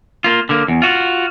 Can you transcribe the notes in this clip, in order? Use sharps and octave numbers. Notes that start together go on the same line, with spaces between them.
A#3 F4
D3 A#3
E2
F4 F#4